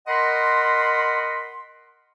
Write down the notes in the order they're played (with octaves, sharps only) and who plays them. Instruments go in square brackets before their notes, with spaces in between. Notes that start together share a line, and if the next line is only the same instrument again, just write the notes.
[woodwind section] A#4 D#5 F#5 B5 C6